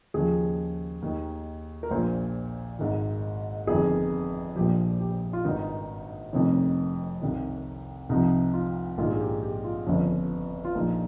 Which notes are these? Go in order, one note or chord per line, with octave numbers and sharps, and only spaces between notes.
D#2 C#3 F3 G#4
D#2 D#3
A#4
A#1 A#2 F3 C5
G#1 G#2 D#3
G1 F2 D#3 G#4
A#1 A#2 F3 G4
G4
F4
G#1 G2 D#3 D#4
F1 F2 C3 D#3 C#4
C2 C3 D#3
C2 C3 F3 D#4
F4
A#1 G#2 D#3 F4
G#4
G4
G4
F4
G1 F2 C#3 F3 C#4
F4
A#1 A#2 F3 D#4